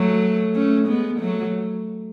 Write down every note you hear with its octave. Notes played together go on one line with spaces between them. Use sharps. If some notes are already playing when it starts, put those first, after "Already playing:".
Already playing: F#3 A3
A3 C#4
G#3 B3
F#3 A3